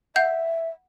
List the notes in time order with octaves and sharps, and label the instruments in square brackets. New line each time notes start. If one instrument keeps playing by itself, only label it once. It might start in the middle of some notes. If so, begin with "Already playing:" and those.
[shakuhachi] E5 [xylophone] F#5 G6